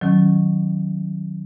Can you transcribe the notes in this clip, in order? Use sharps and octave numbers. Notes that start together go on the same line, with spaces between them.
D#3 F#3 C#4